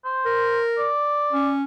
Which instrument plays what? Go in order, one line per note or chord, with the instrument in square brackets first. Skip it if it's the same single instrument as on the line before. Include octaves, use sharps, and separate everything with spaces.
[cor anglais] C5
[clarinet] A#4
[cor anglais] D5
[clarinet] C#4